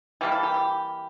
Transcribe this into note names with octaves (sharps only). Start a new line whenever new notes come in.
E3 G3 A#3 G4
A4
G4
G4